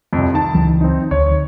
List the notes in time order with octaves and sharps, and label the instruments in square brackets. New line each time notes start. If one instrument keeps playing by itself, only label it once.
[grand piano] C2 F2
D#3 A5
[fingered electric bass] C#2 E3 F#3
[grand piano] C4 D#4
[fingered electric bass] D2 [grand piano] C#5